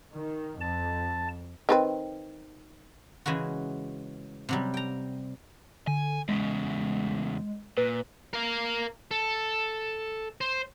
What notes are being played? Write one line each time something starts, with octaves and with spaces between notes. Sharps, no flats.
D#3
F2 A5
D#3 C4 B4
C#3 E3 G#3 E4 F#4
C3 F#3 G3
G5 A#5
D3 G#5
E2 C#3 G#3
A#2 B4
A#4 F5
A4
C5